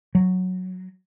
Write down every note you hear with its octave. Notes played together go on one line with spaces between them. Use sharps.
F#3